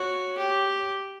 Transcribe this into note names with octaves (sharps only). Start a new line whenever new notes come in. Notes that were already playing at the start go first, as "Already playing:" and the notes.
Already playing: F#4 C#5
G4